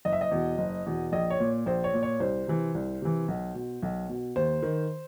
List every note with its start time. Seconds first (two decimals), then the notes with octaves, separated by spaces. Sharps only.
0.05 F#1 D#5
0.13 E5
0.21 D#5
0.31 E2 B2
0.58 F#1
0.86 E2 B2
1.12 A#1 D#5
1.30 C#5
1.40 A#2
1.66 A#1 C5
1.84 C#5
1.94 A#2
2.03 C#5
2.20 C2 C5
2.47 C3 E3
2.75 C2
3.02 C3 E3
3.28 B1
3.55 B2
3.83 B1
4.09 B2
4.36 D#2 C5
4.62 D#3